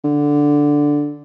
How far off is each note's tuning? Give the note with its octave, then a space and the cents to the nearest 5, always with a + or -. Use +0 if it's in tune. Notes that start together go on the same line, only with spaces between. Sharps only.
D3 -5